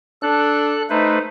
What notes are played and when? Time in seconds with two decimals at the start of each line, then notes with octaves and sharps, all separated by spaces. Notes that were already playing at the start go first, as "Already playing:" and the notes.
0.22 D4 A4 F#6
0.90 A3 D#4 B4 C5